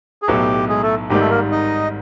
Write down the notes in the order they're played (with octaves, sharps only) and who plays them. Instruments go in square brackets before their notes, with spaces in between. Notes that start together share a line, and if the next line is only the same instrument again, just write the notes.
[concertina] G#4
[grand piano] B1 A2 F#3 B3 [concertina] G4
[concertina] G#3 G#4
A3 A4
[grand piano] G#1 G#2 D#3 G3 [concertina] G4
[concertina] A3 A4
A#3 A#4
D#4 D#5